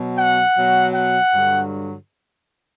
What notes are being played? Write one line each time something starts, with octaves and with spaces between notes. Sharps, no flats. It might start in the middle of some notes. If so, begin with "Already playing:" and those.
Already playing: B2 F#3
F#5
B2 F#3
F#5
G2 D3 F#3